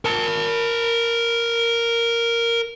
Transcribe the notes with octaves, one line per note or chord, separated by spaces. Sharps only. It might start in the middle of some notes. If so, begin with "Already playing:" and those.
A#4 A5